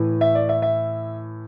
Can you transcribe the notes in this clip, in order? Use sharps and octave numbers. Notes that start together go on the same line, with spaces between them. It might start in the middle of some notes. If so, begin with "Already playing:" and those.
Already playing: A2 E3
E5
D5
E5
E5